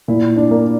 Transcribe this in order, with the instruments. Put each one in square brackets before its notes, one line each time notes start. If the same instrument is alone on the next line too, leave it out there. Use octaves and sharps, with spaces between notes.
[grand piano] A#2 [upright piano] E4
[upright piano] D4
[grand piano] A#3